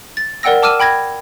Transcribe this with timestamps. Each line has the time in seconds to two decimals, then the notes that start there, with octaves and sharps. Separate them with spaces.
0.17 A6
0.43 A#4 D5 F#5 G5 E6 A#6
0.63 A5 D6 E6 F6 D#7 E7
0.80 G5 B5 G#6 A#6